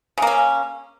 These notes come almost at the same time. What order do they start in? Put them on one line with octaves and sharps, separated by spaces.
C#3 A#3 C#4